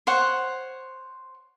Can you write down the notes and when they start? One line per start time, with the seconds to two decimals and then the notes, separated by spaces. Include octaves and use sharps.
0.07 C5 C#5 F#5